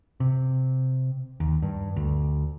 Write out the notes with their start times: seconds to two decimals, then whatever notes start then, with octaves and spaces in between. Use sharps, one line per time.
0.20 C3
1.40 D#2
1.62 G2
1.96 D2